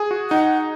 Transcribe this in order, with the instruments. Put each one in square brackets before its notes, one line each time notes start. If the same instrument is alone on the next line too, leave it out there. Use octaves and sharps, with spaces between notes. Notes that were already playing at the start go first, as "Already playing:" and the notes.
Already playing: [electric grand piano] G#4 G#5
F#4
[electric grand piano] D#4 [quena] F#5